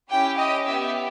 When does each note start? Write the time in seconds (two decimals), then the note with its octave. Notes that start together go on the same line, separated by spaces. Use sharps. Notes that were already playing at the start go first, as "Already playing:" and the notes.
0.11 C#4 E4 G4 G5
0.38 D#5
0.66 B3 G4 E5